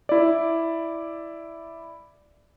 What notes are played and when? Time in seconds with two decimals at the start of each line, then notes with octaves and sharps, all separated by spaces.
0.09 E4 D5